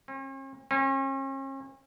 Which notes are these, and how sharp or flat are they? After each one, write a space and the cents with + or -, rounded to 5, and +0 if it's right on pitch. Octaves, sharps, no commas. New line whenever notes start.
C#4 -45
C#4 -40